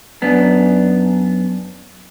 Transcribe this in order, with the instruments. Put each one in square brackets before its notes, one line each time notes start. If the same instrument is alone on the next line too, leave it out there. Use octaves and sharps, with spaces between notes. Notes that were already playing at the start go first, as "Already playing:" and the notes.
[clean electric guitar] F#2 B3 D4